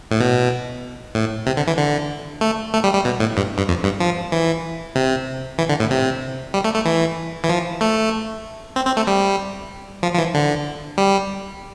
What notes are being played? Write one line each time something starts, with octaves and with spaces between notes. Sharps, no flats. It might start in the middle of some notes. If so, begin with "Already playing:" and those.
A2
B2
A2
C3
D3
E3
D3
A3
A3
G3
G3
B2
A2
G2
G2
F2
G2
F3
E3
C3
E3
D3
A2
C3
G3
A3
A3
E3
E3
F3
A3
C4
C4
A3
G3
F3
F3
E3
D3
G3